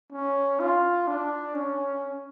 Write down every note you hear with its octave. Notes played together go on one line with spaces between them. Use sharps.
C#4
F4
D4
C#4